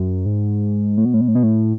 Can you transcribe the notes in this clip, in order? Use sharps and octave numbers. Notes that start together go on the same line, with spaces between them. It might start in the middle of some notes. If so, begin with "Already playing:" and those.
Already playing: F#2
G#2
A2
B2
A2
B2
A2
B2
A2